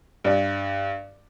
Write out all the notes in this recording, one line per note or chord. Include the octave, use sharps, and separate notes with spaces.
G2 D5